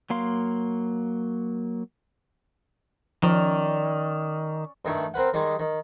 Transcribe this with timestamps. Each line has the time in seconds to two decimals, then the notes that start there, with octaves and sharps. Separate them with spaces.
0.10 F#3 A#3 F5 C6
3.23 D#3 F3 C#4 D5 D6
4.85 G2 D#3 A3 E4
5.14 C4 A#4 B4 F#5
5.34 D#3 G3 G#3
5.59 D#3